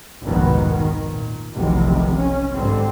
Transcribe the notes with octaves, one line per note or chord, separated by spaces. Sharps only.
F1 C2 G#2 B2 D#3 B3
D#3
A#2
F1 B1 E2 C3 D#3
C#4
G#1 D3 G3 C4